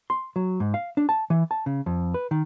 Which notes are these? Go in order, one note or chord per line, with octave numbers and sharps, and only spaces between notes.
C6
F#3
G#2
F5
D4
A5
E3
A5
C#3
F2
B4
D#3